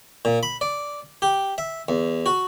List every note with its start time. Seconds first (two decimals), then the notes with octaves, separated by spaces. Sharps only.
0.25 A#2
0.43 B5
0.61 D5
1.22 G4
1.58 E5
1.89 E2
2.26 F#4